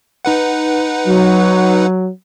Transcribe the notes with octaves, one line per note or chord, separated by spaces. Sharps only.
D#4 B4 F#5
F#3